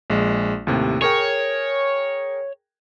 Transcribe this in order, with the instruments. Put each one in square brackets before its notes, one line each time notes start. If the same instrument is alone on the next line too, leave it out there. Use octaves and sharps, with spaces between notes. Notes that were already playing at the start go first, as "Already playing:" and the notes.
[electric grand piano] A#1 G#3
D#2 A2 C3
[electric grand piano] G#4 A#4 G5 [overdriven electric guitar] C#5